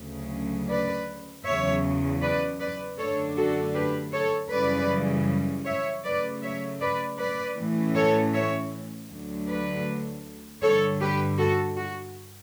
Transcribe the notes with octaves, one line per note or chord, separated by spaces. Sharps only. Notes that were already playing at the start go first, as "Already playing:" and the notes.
Already playing: D2 C#3 F#3
B4 D5
E2 C#3 F#3 C#5 E5
B4 D5
B4 D5
F#2 D3 A3 D4 A4 C#5
F#4 A4
G4 B4
A4 C#5
F#2 C#3 E3 G3 B4 D5
C#5 E5
C#3 F#3 A3 B4 D5
C#5 E5
B4 D5
B4 D5
A2 E3 A3 C#4
A4 C#5
C#5 E5
D2 D3 F#3
B4 D5
G2 D3 G3 A4 C#5
G4 B4
F#4 A4
F#4